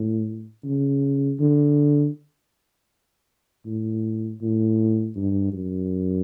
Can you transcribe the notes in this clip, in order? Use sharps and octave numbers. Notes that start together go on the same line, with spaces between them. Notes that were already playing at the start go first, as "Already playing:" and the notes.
Already playing: A2
C#3
D3
A2
A2
G2
F#2